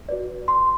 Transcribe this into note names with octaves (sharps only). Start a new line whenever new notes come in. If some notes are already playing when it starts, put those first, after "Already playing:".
F#4 B4 D5
C6